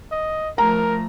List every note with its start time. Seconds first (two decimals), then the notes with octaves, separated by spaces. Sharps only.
0.12 D#5
0.58 F3 A3 A#4 A#5